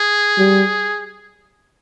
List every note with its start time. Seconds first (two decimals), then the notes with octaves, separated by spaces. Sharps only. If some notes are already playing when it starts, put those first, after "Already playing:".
Already playing: G#4
0.38 G3